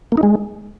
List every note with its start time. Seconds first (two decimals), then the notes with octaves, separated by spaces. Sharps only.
0.12 A#3
0.17 D#4
0.23 G#3